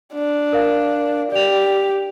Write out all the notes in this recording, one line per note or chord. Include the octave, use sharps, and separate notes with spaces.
D4
A#4 F5
G4 D5 F7